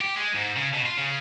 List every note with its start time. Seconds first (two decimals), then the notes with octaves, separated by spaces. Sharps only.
0.01 G4
0.17 G#3
0.35 G#2
0.56 C#3
0.73 B2
0.85 F4
0.98 C#3